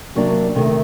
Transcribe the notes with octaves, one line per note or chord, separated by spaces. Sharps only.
C3 F#3 A#3 D4
D2 C3 D#3 A3